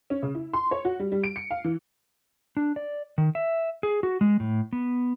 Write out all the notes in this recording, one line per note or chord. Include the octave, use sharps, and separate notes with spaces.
C#4
C#3
E4
C6
C#5
F#4
G3
G3
D7
C#7
F5
E3
D4
D5
D#3
E5
G#4
F#4
G#3
A2
B3